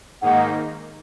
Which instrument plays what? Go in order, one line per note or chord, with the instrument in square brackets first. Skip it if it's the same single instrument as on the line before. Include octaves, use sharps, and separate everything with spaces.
[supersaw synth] G#2 D#3 A#3 D#4 [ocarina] F#5